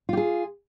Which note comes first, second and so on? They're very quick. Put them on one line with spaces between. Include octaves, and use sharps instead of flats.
F4 G4 G#4